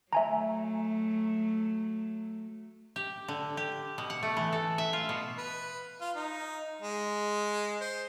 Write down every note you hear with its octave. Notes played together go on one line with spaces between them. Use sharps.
F#3 A3 E5 G#5 A#5
G4
D3
G4
B2
F#5
A3
E3
A4
E5
F4
B2
B4
F4
D#4
G#3
C5